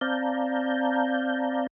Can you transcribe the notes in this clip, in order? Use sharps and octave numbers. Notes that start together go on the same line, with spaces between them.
C4 D5 F5 A5 A#5 G6